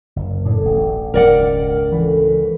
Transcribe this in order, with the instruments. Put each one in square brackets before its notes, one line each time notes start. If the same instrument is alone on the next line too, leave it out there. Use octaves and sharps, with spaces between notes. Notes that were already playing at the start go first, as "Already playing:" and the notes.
[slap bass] F#1
[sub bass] A2 [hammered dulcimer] D4 G#4 A4
[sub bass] D1 [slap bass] A1 B2
[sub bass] E1 [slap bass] C#2 G#2 [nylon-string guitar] A#4 D5 F#5
[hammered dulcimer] D3 B4 C#6 [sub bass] E3